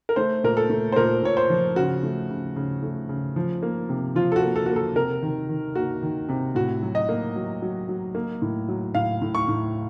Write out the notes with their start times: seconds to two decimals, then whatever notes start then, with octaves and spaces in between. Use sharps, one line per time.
0.09 A#4
0.16 A3 C5
0.44 A#2 A#4
0.57 A4
0.70 A3
0.92 C5
0.96 A#2 A#4
1.23 A#2 C#5
1.37 C5
1.50 F3
1.76 C#3 F#4
2.03 A3
2.30 C#3
2.56 C#3
2.83 A3
3.09 C#3
3.36 F3
3.63 A#3
3.89 C3
4.15 F3 F4
4.32 A4
4.36 F#4
4.42 A#3
4.56 A4
4.66 A#3 F#4
4.76 A4
4.96 C3 A#4
5.22 D#3
5.49 D#3
5.75 A#3 F#4
6.02 D#3
6.29 C3
6.55 A2 F#4
6.82 F#3
6.95 D#5
7.09 A#3
7.36 F#3
7.62 F#3
7.89 F#3
8.15 A#3
8.42 A2
8.68 F#3
8.95 A2 F5
9.22 A2
9.35 C#6
9.48 A2